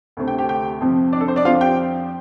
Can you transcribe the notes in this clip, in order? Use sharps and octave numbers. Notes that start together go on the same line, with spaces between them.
D2 C3 A3 C4
G4 G5
G4 G5
G4 G5
F2 C3 F3 C4
D4 D5
A4
C5
D4 D5
F2 F3 C4 F4 F5
G4 G5